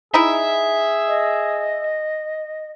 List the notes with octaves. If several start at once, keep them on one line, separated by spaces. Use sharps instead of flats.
D#4 E4 G#4 E5
D#5